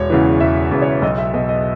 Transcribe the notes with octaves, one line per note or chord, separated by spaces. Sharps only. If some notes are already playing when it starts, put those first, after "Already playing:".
Already playing: E1 C#5
E2 C#3 E3
E1 E5
E2 C#3 E3
C#5
B1 D#5
E5
B2 D#5
D#5